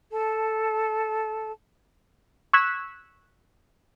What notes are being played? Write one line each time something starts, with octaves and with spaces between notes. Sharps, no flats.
A4 A5
C#6 E6 F#6 G#6 B6 E7